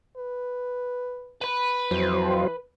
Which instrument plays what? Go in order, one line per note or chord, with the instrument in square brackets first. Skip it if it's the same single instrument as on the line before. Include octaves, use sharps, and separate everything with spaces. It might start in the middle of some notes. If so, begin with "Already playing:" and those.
[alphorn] B4
[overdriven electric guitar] B4 B5
[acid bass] F2 [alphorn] E3 [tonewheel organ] F#3 C5